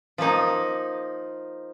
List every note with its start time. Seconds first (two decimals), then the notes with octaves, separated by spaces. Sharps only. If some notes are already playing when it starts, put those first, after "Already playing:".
0.18 F3 A#3 D#4